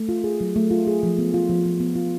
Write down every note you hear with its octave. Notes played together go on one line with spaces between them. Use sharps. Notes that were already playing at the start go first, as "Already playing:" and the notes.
Already playing: A3
F4
G#4
F#3
A3
F4
G#4
F3
B3
F4
F3
F3
B3
F4